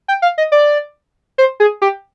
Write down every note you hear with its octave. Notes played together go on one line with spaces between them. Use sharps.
G5
F5
D#5
D5
C5
G#4
G4